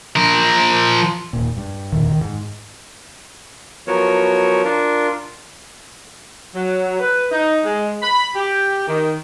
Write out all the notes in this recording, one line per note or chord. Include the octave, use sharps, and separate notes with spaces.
F3 A#4
D#1 A#2
G2
E1 D2 A#2 D#3
D#3
G#2
F3 F#3 B3 F#4 A#4 C#5
D4 F4 A#4
F#3
B4
D#4
G#3
B5
G4
D#3